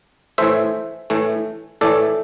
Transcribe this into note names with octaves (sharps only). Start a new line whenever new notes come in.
A2 E3 A3 C5 E5
A2 E3 A3
A2 E3 A3 A4 D5